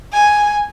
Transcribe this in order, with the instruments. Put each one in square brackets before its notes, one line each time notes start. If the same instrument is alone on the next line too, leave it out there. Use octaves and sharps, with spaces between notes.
[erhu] G#5